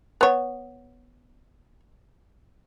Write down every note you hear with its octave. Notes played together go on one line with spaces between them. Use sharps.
B3 C#5